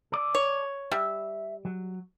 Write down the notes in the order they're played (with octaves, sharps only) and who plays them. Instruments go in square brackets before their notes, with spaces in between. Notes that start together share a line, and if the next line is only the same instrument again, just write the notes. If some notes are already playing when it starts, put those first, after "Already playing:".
[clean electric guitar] A4 D5
[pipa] C#5
[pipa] G3 [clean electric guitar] E5
[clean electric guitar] F#3